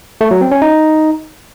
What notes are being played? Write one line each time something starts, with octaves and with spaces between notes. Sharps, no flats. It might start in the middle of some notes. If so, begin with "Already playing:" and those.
A3
F#3
C4
C#4
D#4